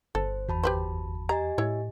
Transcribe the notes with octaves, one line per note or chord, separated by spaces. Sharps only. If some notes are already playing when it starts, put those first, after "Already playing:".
G1 A4 C5
E2 F#4 A5 B5
G4 B4 C5
G4 D#5 G#5 A#5
A2 E4 C#5